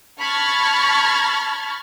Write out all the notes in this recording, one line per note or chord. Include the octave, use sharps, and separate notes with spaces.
A5 B5 C#6 F6 G#6 A6